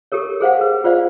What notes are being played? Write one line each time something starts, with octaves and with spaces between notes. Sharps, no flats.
G4 A4 A#4 C#5
G#4 C5 F5 F#5
B4
F4 C5 D5 F5